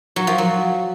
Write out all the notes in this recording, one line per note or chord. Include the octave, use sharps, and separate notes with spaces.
F#3
F3
F#3